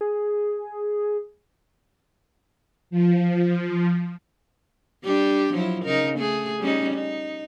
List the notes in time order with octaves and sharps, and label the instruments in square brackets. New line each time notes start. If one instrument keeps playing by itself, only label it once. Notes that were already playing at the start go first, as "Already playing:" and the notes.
[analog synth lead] G#4
[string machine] F3
[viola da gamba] G3 D4 G4
F3 F#3 E4
C#3 D#4 A#4
A3 G#4
G3 C#4 D#4
D#4